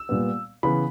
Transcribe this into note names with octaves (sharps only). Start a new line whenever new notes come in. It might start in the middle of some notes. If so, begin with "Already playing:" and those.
Already playing: E6
A#2 G3 B3
C#3 E3 B3 B5